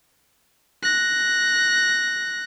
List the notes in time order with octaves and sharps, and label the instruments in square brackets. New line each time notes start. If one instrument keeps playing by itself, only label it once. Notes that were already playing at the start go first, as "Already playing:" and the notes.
[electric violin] F#6 A#6